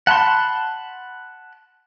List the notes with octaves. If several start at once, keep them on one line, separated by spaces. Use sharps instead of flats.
F#5 A5 B5 C6